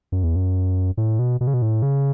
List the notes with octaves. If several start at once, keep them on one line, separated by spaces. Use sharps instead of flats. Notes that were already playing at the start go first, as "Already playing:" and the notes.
F#2
E2
F#2
A2
B2
B2
C#3
B2
A2
C#3